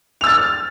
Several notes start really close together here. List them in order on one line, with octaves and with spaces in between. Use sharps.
F7 E6 A6 F6